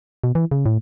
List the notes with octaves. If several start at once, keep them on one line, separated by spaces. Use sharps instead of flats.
B2
E3
C#3
A2